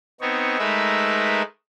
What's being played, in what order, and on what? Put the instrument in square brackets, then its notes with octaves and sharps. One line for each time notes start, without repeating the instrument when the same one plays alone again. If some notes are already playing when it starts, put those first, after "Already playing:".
[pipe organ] B3 C4 D#4 C#5
G#3 A3 D#4 A#4 B4 E5